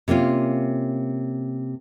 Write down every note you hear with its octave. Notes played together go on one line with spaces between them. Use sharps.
C3 A#3 C#4 F4